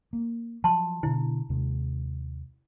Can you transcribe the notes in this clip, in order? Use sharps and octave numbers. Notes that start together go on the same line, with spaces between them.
A#3
F3 F#3 A5 C6
B2 D3 E4
D#2 C3 G#3